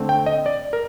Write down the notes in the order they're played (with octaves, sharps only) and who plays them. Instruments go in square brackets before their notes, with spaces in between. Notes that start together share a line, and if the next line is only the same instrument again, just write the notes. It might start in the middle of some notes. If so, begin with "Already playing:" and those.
Already playing: [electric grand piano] D3 A3 C4
G5
D#5
D5
A#4